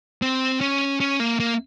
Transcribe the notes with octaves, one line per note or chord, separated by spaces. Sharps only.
C4
C#4
C#4
A#3
A#3